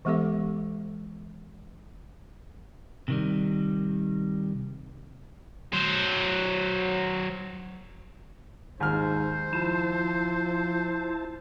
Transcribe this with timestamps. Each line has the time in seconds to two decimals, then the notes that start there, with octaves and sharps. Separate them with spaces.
0.05 E3 G#3 B3 G4 A4 E5
3.08 C3 D#3 G3
5.73 F#3 C5
8.80 D#2 G#2 C5 F6
9.53 F3 E4 A5